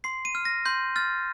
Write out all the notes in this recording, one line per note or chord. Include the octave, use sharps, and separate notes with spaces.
C6 C7
D#7
F6
A#6
C6 G6
F6 A6